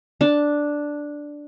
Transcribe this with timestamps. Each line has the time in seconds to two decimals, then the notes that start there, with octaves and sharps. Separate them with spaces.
0.21 D4 A5